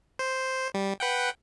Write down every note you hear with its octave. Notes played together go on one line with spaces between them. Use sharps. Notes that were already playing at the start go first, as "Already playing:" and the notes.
C5
G3
B4 F#5 G5